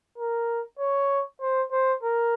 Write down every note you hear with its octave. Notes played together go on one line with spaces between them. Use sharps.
A#4
C#5
C5
C5
A#4